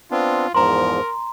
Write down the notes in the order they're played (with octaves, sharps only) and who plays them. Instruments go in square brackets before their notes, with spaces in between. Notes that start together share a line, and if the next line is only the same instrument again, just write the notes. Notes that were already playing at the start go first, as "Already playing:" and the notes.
[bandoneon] B3 C4 D4 [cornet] F4
[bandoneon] E2 G#2 F3 [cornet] A#4 [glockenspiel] A#5 C6